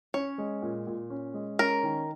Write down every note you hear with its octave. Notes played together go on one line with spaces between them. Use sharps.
C#4 C#5
G#3
A#2
A#2
C#4
G#3
C#4 A#4
D#3